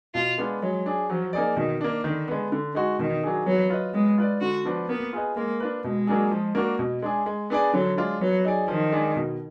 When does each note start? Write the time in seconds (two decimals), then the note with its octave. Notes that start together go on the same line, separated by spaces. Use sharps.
0.14 B2 F4
0.38 G#3 B3 D4 F4
0.62 F#3 G#3
0.86 D4 G#4
1.10 F3 F#3
1.33 A#3 D#4 G#4 D5
1.56 B2 D#3
1.81 A#3 D4
2.04 D3 D#3
2.28 G#3 B3
2.52 D3
2.75 G#3 D#4 F#4
2.99 B2 D#3
3.23 F#3 D4 G#4
3.46 F#3 B3
3.70 F4 B4 D#5
3.94 G#3 B3
4.18 F4 B4 D5
4.41 D3 F#4
4.65 F3 B3 D4
4.89 A#3 B3
5.13 F4 G#4 B4 D#5
5.37 G#3 A#3
5.60 D4 F4 B4
5.84 B2 G#3
6.07 F#3 A#3 D4 G#4
6.31 F3
6.55 A#3 D4 F#4 A#4
6.79 B2
7.02 G#3 D4 G#4
7.26 G#3
7.50 B3 D4 G#4 D5
7.74 D3 F#3
7.97 G#3 D4 F4
8.21 F#3 B3
8.45 D#4 G#4 D5
8.68 D#3 F3
8.92 G#3 D4 G#4
9.16 B2